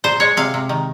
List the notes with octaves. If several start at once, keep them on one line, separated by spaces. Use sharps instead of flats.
A#2 C5
G#3 C#5
C3 F5
C3
D#3